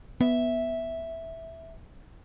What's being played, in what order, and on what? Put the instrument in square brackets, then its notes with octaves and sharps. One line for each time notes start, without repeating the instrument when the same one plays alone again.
[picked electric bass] B3 [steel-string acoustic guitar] E5